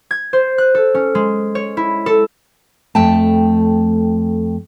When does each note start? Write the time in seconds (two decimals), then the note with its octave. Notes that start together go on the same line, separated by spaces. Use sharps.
0.11 G#6
0.33 C5
0.58 F#6
0.75 A4
0.95 C#4
1.15 G#3
1.55 C#5
1.77 E4
2.06 A4
2.95 F2 A3 G5 A5